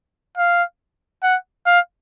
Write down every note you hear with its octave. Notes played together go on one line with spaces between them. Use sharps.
F5
F#5
F5